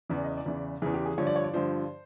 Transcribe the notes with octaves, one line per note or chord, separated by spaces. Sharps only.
E2 C#3 E3 D5
D#5
D5
E2 C#3 E3
E2 C#3 E3 G#4
G4
G#4
G2 D3 F3 C#5
D5
C#5
D5
G2 D3 F3 C5